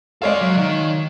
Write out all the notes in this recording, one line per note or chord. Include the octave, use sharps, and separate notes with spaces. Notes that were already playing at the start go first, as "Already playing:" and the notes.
G#3 A4 C#5 D5 F5
F#3
D#3